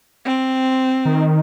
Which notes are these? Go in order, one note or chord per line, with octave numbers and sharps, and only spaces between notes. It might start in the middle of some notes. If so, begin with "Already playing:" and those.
C4
D#3